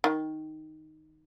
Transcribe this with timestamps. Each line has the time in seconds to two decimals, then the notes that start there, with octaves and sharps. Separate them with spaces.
0.04 D#3